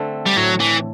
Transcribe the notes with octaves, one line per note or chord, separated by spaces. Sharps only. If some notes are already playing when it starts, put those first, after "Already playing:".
Already playing: D3 A3 C4
G3
A2 F#3
E3